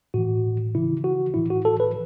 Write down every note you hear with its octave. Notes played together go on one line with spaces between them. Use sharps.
A2 E3 F#4
C#3 E3 E4
F#4
A2 E3 E4
F#4
A4
B4